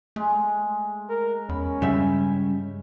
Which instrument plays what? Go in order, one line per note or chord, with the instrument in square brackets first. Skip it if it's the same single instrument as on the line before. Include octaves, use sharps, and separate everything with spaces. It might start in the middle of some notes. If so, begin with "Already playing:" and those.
[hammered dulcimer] G#3 [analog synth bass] A3
[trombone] A#4
[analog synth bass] E2 [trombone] C#4 [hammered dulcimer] B5
[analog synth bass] G2 [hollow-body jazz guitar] C#3 G3 E5